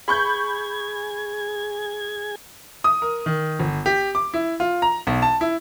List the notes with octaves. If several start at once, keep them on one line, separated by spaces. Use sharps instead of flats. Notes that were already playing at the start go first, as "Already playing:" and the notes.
G#4 B5 C#6 G6 G#6
D#6
A#4
D#3
G1
G4
D6
E4
F4
A#5
B1
A5
E4